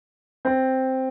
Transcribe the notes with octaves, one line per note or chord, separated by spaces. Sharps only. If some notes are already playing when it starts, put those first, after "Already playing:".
C4